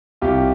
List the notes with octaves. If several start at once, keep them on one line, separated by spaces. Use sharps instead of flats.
C2 F4 G4